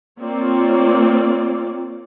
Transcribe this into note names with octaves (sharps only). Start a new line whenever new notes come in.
A#3 C4 F4 C#5 D5